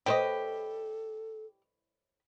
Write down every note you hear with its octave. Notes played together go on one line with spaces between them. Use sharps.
G4 A4 B4 C5 D#5